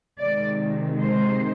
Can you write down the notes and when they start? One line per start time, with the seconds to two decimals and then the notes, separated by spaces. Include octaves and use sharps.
0.20 C3 D#3 G#3 D5
1.01 C5